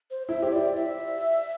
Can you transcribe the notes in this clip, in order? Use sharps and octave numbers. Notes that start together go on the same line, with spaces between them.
C5
E4 E5
G4 C5
E4 D5
E5